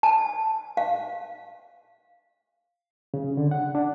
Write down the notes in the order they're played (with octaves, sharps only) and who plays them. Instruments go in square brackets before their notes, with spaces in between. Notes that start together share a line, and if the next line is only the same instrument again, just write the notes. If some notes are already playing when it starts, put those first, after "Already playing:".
[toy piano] A5
F5
[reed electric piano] C#3
D3
F#5
D4